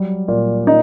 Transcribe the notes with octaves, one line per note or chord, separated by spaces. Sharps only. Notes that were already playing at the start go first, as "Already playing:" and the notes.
Already playing: F#3 G3
A#2
A#2 D#4